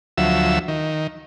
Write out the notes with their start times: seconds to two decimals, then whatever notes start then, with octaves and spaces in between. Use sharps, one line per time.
0.18 D2 F3 F#3 E5 E6
0.68 D#3